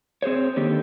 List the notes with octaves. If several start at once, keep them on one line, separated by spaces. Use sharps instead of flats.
C4 G#4 C5 C#5
D3 D#3 A#3 G4